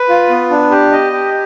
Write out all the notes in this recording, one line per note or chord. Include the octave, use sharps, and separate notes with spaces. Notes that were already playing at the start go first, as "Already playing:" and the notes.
Already playing: B4
F4
B3
D4
G4
D#5
G4